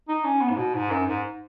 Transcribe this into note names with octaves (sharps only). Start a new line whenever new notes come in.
D#4
C#4
B3
G#2
B2
G#2
F#2
G#2